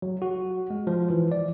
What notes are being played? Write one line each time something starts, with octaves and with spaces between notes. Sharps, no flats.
F#3
F#4
G#3
F3
E3
D5